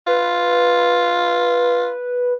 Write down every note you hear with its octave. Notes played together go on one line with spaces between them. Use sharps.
F4 B4